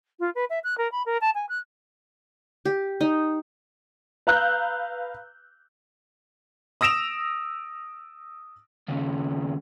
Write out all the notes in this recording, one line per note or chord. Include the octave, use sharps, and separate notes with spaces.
F4
B4
E5
F#6
A#4
B5
A#4
A5
G#5
F#6
G4
D#4
B4 F5 A#5 E6 F#6 G6
D#6 E6 A#6 D7 E7 F7
D#2 C#3